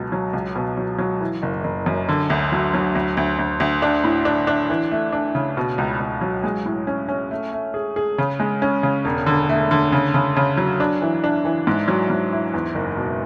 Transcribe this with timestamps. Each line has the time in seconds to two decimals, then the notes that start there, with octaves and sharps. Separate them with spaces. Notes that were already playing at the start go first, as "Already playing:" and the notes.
Already playing: C#2 B2 F#3
0.12 F#3
0.33 C#2
0.56 B2
0.77 F#3
0.99 F#3
1.21 E3
1.43 F#1
1.64 F#1
1.86 F#2
2.09 D3
2.30 D2
2.52 F#3
2.74 F#3
2.95 D2
3.17 D2
3.39 D2
3.60 D2
3.82 D4
4.04 A2
4.25 D4
4.47 D4
4.70 E3
4.91 A3
5.13 D4
5.35 C#3
5.57 B2
5.78 C#2
6.00 C#2
6.21 F#3
6.44 G#3
6.65 A2
6.87 C#4
7.09 C#4
7.31 A3
7.53 A3
7.74 G#4
7.96 G#4
8.18 C#3
8.40 G#3
8.62 C#4
8.83 C#3
9.05 E1
9.26 D3
9.49 A3
9.71 D3
9.92 C#3
10.14 C#3
10.37 C#3
10.58 F#3
10.80 D4
11.02 E3
11.24 D4
11.45 E3
11.67 G#2
11.88 F#3
12.10 G#2
12.33 E4
12.53 E2
12.75 F#1
12.97 B2